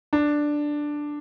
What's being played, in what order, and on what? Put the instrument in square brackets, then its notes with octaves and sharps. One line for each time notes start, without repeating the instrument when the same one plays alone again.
[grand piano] D4